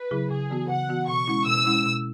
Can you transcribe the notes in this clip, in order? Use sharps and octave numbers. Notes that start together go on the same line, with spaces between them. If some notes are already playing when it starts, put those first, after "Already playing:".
Already playing: B4
C#3 F#3 E4 G#4
C#3 G#4
E3 B3 F#4
C#3 F#5
E3 B3 F#4
B2 C#6
G#3 C#4 E4
B2 E6
G#3 C#4 E4
B2